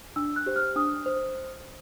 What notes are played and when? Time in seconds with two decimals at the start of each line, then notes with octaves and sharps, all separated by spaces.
0.16 D4 E6
0.36 F#6
0.46 G4 C5
0.56 F6
0.76 D4 D#6
1.06 C5